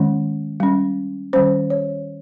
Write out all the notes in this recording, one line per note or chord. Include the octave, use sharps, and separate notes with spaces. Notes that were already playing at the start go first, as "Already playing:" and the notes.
Already playing: D#3 G#3 C#4
G3 C#4
D#3 G3 C#4 C5
C#5